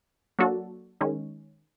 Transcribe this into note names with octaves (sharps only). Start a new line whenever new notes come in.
F#3 A#3 D4 F#4 A4
D#3 G#3 C#4